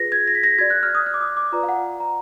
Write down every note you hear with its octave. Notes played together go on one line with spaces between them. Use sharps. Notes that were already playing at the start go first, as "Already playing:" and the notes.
Already playing: F4 G#4 B4 A#6
G#6
A#6
B6
A#6
F#4 D5 G#6
F#6
F6
D#6
F6
D6
D#6
D6
F4 B4 D5 A#5
F5
F#5
A#5